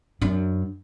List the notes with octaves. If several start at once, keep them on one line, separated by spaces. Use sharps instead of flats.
F#2 D4